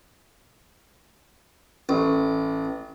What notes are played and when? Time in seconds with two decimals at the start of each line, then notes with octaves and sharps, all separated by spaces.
1.89 A1